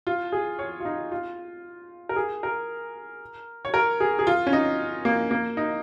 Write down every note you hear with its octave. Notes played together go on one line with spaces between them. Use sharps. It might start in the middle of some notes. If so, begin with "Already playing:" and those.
F4
G#4
C#5
F4
D#4
F4
A#4
G#4
A#4
C#5
A#4
G#4
G#4
F4
C#4
D#4
A#3
A#3
D#4